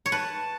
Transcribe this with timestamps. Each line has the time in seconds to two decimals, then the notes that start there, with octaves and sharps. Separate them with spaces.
0.06 C#5
0.12 B4 A5